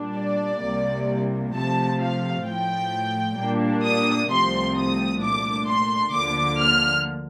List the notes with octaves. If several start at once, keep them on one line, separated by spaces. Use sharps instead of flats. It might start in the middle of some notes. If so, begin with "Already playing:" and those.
Already playing: A#2 G3 D4
D5
C2 C3 G3 A#3
C3 F3 A3 C4 A5
F5
A2 F3 A3 G5
A#2 G3 A#3 D4
D#6
C2 C3 F3 A3 C4 C6
D#6
A#2 A3 D4 D6
C6
D2 D3 F3 A#3 D6
F6